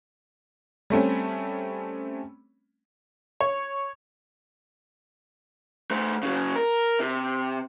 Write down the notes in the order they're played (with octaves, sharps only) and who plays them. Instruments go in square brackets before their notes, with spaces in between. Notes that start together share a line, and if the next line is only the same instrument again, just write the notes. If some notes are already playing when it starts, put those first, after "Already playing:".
[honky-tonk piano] G3 A3 C4 C#4
[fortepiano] C#5
[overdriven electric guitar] A3 C5
C#3 F#3
A#4
C3